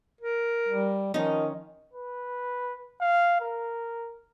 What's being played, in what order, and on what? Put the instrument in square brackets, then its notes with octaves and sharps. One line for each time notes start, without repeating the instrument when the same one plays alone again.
[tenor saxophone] A#4
[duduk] G3
[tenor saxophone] D#3 [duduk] F3 [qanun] C#4 D#4
[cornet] B4
F5
A#4